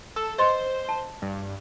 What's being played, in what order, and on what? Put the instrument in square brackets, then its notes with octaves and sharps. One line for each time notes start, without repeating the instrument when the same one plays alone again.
[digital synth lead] A4 [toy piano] E6
[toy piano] B4 D#5 C6 [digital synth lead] C5
[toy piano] A5
[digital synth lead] G2